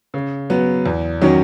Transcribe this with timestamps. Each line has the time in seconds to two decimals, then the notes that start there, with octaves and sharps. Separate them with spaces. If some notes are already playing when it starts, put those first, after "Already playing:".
0.14 C#3
0.50 F#3 B3
0.86 E2
1.22 D#3 F#3 C#4 F#4